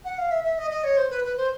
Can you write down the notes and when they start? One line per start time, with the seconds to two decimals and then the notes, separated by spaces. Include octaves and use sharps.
0.05 F#5
0.18 F5
0.31 E5
0.44 E5
0.58 D#5
0.71 D#5
0.84 C#5
0.97 C5
1.10 B4
1.24 B4
1.37 C5